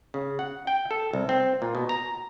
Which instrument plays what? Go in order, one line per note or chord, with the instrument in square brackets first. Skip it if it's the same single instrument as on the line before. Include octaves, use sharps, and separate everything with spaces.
[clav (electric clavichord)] C#3
F#5
G5
A4
C2
C4
A#2
B2
A#5